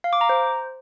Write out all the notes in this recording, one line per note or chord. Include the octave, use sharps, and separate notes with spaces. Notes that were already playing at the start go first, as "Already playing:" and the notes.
F5
D6
A#5
C5